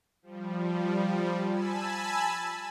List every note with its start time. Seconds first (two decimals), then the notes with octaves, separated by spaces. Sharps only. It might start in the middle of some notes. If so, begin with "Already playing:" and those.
0.22 F3 G3
1.48 G#5 A5 B5 E6